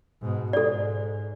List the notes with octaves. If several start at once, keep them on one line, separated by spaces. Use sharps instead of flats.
G#2 B2
G#2 A4 D5